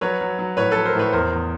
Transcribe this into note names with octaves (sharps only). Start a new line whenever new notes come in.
F#3 B4 C#5
F#3
F#3
A2 B4 C#5
A4 B4
F#3
A#4 C5
A2 B4 C#5
E2 A#4 C5
E2